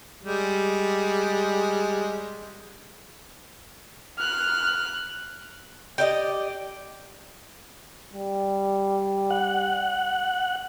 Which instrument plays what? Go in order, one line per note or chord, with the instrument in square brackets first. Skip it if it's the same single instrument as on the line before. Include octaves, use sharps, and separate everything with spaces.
[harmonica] G3 G#3
[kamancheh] F6 F#6
[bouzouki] G4 D5 D#5
[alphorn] G3
[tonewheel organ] F#5